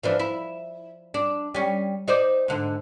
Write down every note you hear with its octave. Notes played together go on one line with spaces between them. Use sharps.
E3 F3 D4
E4
D4
G3 C#4
D#4 C5 D5
G#2 D3